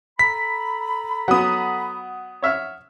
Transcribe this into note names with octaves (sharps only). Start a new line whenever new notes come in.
A4 A#5 B5 B6
F#3 B3 F#5 D#6
C#5 E5 F6